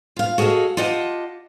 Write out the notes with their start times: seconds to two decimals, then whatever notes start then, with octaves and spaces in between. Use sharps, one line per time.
0.17 F4 F5
0.38 F#4 G#4 A4 D#5 F5
0.77 F4 G4 D#5 F#5 A5